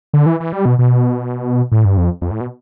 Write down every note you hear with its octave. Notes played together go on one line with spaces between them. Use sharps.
D3
E3
E3
G3
B2
B2
A2
G2
F2
F2
A2
B2